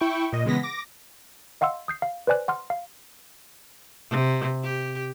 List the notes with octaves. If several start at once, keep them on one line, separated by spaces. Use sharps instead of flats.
E4 G5 C#6
A#2 D#5
C#3 E3 G#3 B3 A#6 B6
D6 A#6
D#5 F5 F#5 C6 E6
D#6 G6 C7
F5
B4 C5 D5 G#5 F#6
F#5 C6 F6
F5
C3
G4